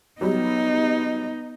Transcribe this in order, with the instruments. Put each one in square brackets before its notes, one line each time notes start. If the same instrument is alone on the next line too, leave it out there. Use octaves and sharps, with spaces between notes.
[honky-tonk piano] F#3 G3 [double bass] B3 [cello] D#4 [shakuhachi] D#5